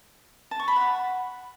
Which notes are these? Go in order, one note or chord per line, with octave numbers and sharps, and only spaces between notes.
A5
C#6
B5
F#5